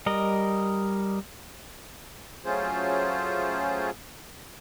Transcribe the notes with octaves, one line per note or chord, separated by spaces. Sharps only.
G3 A#4 D#5
F#3 A3 C#4 F4 G#4 C5